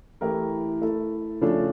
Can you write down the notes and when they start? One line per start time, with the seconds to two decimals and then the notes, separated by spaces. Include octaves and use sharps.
0.21 E3 A3 E4 G4 A#4
0.81 A3 E4 A4
1.41 C#3 F3 A3 D4 A4